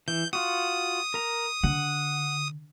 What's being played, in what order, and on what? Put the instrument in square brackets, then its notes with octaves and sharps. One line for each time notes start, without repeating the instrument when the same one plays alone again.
[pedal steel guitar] E3 [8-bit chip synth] G6
[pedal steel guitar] F4 F#4 [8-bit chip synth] D#6
[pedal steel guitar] A#4 A#5
[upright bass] D3 [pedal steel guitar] F#5